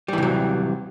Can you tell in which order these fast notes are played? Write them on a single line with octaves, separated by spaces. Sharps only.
G3 E3 C3 F#3